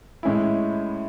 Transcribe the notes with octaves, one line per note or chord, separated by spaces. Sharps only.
A2 G#3 C#4 E4